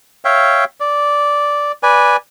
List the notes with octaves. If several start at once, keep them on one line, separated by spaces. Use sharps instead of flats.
C#5 E5 F5 G5
D5
B4 D5 G#5